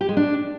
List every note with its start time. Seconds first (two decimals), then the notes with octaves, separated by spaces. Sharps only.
0.01 G4
0.09 G#3
0.17 D4